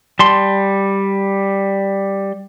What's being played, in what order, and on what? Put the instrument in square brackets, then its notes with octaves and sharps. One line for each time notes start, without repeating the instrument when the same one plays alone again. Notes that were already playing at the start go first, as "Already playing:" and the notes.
[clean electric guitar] G3 A5 C6